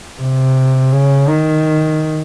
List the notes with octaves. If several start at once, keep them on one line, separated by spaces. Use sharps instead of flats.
C3
C#3
D#3